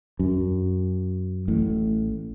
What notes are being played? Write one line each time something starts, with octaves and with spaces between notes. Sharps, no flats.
F#2
A1 A2